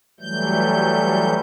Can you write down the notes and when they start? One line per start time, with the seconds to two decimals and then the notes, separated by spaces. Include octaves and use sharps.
0.20 E3 F#3 G3 A3 G6